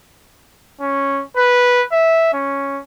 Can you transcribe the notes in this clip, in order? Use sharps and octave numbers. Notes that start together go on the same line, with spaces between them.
C#4
B4
E5
C#4